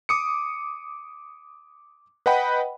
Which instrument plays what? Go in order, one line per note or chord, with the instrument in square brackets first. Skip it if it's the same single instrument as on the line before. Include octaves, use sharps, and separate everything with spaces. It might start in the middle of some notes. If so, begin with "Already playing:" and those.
[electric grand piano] D6 D#6 C#7
B4 D#5 F#5 G5 B5